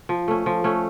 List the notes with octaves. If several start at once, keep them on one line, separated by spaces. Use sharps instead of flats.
F3
A3 C#4
F3
A3 C#4